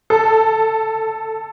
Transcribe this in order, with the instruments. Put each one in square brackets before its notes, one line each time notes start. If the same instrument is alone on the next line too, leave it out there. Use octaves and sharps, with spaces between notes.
[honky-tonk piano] A4